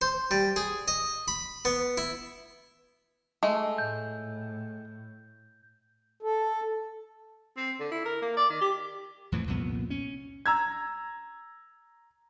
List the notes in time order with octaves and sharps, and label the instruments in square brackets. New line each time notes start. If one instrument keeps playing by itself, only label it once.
[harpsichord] C5
G3
G#4
D#5
B5
B3
E4
[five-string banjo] G#3 A3
[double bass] A2 [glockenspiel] G6
[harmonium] A4
[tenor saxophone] C4
D3
E4
A#4
A#3
D5
D#3
G4
[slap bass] F2 A2 E3 F3
C2 F2 A#2 B3
C#4
[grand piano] A#5 E6 G#6